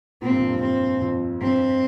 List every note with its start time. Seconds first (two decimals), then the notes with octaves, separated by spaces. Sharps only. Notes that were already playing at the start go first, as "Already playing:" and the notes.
0.22 A#2 C4
0.31 G2
0.40 F2
0.49 G2
0.61 G2 C4
1.01 F2
1.41 G2 C4